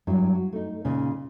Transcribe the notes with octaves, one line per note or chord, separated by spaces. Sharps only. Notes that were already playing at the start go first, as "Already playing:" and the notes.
G2 F#3 E4
F#4
A3 D#4
A#2 C#3 G#3 D#4 F4